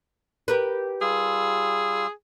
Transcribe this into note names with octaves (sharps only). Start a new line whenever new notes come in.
G4 A#4 B4
G3 F4 G#4 E6